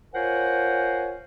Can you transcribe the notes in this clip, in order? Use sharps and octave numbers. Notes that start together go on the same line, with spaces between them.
F4 A#4 C5 C#5 F#5 G#5